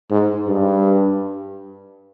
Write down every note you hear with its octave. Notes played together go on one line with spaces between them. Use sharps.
G#2
G2